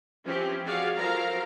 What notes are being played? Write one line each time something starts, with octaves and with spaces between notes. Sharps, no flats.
E3 F3 C4 C#4 G4
F#4 G#4 D5 F5 F#5
F3 F#3 A4 A#4 F5 A#5